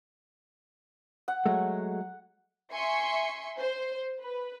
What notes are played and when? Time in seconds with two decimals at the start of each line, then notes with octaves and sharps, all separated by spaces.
1.28 F#5
1.46 F#3 G#3 A3
2.73 E5 G#5 C6 C#6 C#7
3.57 C5
4.20 B4